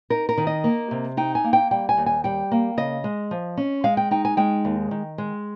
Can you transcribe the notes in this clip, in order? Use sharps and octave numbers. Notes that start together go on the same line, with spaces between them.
D#4 A#4
A#4
D#3
D#5
A#3
C3
D#4 G5
G#5
A#3
G5
G3 G5
G#5
D#2
G#5
G3 G5
A#3
C#3 D#5
G#3
F3
C#4
G#3 F5
G5
D#4 G5
G#5
G#3 G5
D#2
D#3
G#3